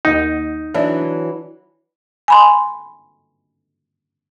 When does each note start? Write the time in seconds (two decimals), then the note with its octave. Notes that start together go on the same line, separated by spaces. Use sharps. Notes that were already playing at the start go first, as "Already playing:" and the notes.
0.05 D#2 D#4 D#5 F#5
0.74 E3 F#3 D4 E5
2.28 G#5 B5 C6